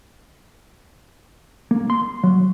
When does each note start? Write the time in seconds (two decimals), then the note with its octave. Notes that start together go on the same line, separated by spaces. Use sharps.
1.71 A#3
1.90 C6
2.24 F#3